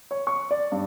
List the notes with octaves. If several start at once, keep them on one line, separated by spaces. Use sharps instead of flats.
C#5
C#6
D5
G2